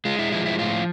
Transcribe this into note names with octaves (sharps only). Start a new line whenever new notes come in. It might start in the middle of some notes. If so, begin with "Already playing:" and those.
G#3 F4
E4
F3 E4
E4
A2 F4